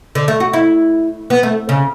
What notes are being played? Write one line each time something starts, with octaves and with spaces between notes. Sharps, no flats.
D3
A3
F#4
E4
B3
A3
C#3